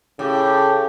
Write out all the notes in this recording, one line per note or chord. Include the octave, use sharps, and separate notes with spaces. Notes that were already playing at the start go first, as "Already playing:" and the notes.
A2 C#3 G4